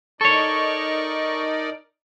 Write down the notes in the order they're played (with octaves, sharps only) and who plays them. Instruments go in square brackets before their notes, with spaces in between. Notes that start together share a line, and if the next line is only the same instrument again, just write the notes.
[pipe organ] D#4 A#4 D5 [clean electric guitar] A4 C#5 [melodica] C#6